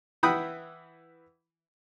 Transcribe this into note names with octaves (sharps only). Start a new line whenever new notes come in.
E3 E4 F#5 G5 B5 D#6